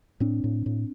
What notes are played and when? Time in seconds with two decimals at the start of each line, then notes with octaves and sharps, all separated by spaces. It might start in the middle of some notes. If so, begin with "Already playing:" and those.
0.20 A2 C4 D4
0.44 A2
0.66 A2